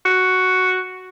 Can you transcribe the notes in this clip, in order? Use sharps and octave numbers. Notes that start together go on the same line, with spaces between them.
F#4